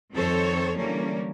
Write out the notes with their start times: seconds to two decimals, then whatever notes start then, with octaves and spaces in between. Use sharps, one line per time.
0.13 F2 D#3 C4 A4 C5 C#5
0.76 D3 E3 F#3 G3 A#3 C#4